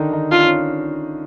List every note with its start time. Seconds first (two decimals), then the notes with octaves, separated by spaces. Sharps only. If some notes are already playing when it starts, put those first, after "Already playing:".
Already playing: D3 D#3 D4 D#4
0.12 D#3 D#4
0.32 D4 F4
0.45 C#4